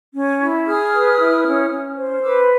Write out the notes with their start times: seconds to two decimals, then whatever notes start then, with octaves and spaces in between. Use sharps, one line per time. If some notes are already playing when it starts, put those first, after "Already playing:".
0.14 C#4
0.40 E4
0.66 G#4 D#6 F6
0.92 B4
1.18 E4
1.45 C#4
1.70 C#4
1.96 C5
2.22 B4 D6 E6